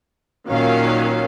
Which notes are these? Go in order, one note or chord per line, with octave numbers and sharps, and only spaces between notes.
A#2 D#3 F#3 C#4 F5